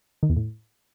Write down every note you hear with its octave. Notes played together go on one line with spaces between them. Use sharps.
D#3
E2
A2